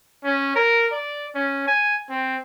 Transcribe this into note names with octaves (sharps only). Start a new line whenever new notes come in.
C#4
A#4
D5
C#4
G#5
C4